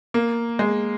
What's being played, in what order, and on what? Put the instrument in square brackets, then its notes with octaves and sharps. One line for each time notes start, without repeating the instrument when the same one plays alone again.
[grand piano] A#3
G#3